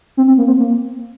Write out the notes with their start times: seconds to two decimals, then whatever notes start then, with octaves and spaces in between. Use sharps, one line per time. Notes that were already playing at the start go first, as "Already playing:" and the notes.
0.17 C4
0.28 C4
0.38 A#3
0.48 C4
0.59 A#3